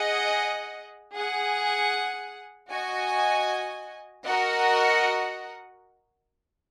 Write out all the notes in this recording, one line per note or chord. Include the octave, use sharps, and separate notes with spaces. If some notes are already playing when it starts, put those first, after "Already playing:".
Already playing: G#4 D#5 F#5
G#4 F#5
F#4 D#5 G#5
F#4 A#4 D#5 F#5